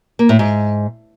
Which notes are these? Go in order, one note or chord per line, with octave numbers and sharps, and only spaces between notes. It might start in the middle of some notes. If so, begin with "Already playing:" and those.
A#3
A2
G#2